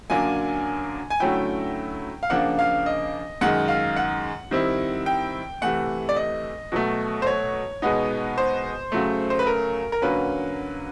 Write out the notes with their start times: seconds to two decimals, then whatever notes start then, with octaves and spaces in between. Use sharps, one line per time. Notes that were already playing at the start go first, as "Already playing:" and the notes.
0.10 F#2 D3 F#3 A#3 D4 G#5
1.10 G#5
1.20 D3 F#3 A3 C#4 E4 G5
2.23 F5
2.30 C#3 F3 A#3 D4 F#5
2.59 F5
2.86 D#5
3.41 F#2 D#3 G#3 F#5
3.68 F5
3.96 F#5
4.51 D#3 G3 C4 E4
5.06 G5
5.62 C3 E3 A3 F#5
6.09 D5
6.16 D#5
6.72 B2 F#3 A3
7.22 C5
7.27 C#5
7.82 B2 G#3 B3 D#4
8.38 C5
8.92 C#3 F#3 A3
9.30 C5
9.39 B4
9.47 A#4
9.92 A#4
10.02 D3 F#3 A#3 C#4 B4